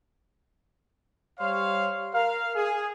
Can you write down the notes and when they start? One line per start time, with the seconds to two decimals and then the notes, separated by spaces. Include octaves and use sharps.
1.39 G3 C5 C#5 F5
2.14 A#4 F5
2.56 G#4